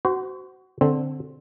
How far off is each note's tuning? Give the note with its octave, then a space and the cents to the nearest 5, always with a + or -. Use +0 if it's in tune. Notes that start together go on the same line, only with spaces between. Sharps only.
F#4 +20 C5 -20
D3 +0 C4 +0